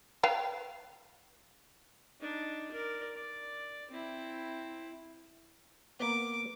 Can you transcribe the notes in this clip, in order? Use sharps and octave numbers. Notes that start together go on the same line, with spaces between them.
B4 F5 G5
D4 D#4
A#4 D5
D5
C4 E4
A#3 B3 D6